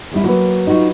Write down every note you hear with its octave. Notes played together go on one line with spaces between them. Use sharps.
E2 G3 E4
F#3 A#3 B4
D#4 F4 F#4